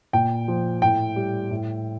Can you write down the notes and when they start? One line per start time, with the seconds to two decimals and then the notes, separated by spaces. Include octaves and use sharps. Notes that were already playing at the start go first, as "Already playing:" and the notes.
0.13 A#2 G5
0.48 F3
0.82 A2 G5
1.16 G3
1.50 A2